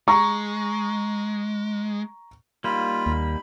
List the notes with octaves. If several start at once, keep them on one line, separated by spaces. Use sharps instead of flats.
G#3 A#5 C#6
G3 A#3 D#4 F4 B5
D#2